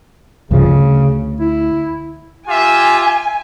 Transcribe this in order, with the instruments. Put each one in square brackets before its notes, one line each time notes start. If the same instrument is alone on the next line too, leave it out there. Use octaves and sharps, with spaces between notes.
[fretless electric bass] C2 G2 F3 [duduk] C#3
[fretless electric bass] D2
[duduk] E4
[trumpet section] F4 G4 E5 [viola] G#5